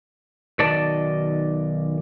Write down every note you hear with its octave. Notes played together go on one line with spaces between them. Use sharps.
B1 D#3 D5 D#5 A5